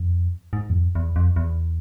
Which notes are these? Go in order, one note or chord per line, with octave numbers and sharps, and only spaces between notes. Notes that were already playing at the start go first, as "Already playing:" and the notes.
Already playing: F2
G#2
E2
F2
E2
F2
E2